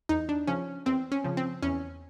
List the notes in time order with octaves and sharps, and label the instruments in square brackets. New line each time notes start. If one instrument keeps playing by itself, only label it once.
[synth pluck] E2 D#4
D4
C#3 F3 C#4
E2 C4
C#4
C#3 F3
C4
E2 C#4